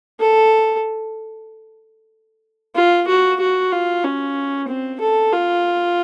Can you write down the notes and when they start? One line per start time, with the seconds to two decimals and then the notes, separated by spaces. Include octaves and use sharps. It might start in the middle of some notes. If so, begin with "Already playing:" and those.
0.20 A4
2.76 F4
3.08 F#4
3.40 F#4
3.72 F4
4.04 C#4
4.68 C4
5.00 A4
5.32 F4